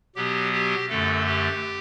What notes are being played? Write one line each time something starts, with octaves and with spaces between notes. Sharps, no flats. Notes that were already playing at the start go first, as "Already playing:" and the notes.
B2 F#3 B3 G4
G4
F#2 D3 A3 A4
G4